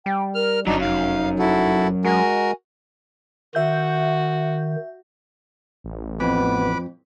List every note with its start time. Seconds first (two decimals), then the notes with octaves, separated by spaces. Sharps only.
0.06 G3 G5
0.35 A#4 F6
0.67 G1 F#2 F#3 D4 D#4 A#5
0.81 F1 D#4 F5
1.39 E4 F#4 A4
2.05 G#3 F#4 A#4 G#5
3.55 D#3 F#4 E5 G6
5.84 A1
6.20 F2 B3 B4 B5 D6